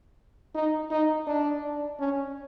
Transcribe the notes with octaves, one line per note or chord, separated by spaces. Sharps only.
D#4
D#4
D4
C#4